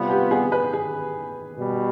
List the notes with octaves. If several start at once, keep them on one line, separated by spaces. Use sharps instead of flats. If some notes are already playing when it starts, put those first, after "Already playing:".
Already playing: C3 G3 B3 F4
G4
G#4
B4
G#4
B2 G3